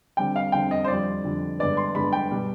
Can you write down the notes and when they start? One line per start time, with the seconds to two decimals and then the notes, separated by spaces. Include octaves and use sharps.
0.17 D3 G3 C4 G5
0.36 F5
0.52 D3 G3 C4 G5
0.71 D#5
0.85 C5
0.88 F2 D3 G3 D5
1.24 F2 D3 G3
1.59 G2 D3 G#3 B3 D5
1.77 C6
1.95 G2 D3 G#3 B3 B5
2.13 G5
2.31 B2 G3 B3